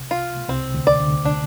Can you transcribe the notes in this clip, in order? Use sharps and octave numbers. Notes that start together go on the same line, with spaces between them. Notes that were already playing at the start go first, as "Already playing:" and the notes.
Already playing: C2 C3
F4
C2 C3 C4
D2 D3
D5
D2 D3
D4